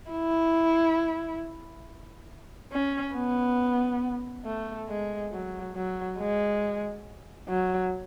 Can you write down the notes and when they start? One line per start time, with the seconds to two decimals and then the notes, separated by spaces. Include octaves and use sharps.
0.11 E4
2.72 C#4
3.15 B3
4.45 A3
4.88 G#3
5.32 F#3
5.75 F#3
6.19 G#3
7.49 F#3